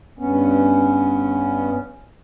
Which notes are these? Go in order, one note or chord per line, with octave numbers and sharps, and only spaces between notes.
G2 B3 C#4